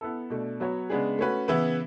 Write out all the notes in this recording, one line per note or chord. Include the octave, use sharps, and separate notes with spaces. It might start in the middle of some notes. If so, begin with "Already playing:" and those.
B3 E4 A4
B2 A3 D4
F#3 B3 F#4 C#5
C#3 G#3 B3 D4 G#4
A3 C#4 F#4 B4
C#3 E3 B3 E4 B4